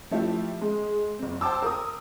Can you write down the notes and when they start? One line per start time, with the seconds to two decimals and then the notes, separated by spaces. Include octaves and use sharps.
0.11 F3 A3 E4 G4
0.61 G#3
1.19 F#1 C4
1.41 C5 G5 A5 D6 E6
1.62 A#4 D#6